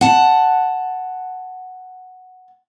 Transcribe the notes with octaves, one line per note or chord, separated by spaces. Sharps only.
F#5 A5